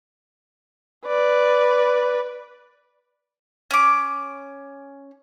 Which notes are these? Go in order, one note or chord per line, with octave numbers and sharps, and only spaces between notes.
B4 D5
C#4 D6